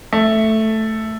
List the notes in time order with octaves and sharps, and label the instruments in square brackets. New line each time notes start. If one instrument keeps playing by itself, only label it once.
[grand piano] A3